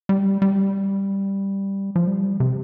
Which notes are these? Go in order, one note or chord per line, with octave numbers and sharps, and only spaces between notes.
G3
G3
F3
G3
C3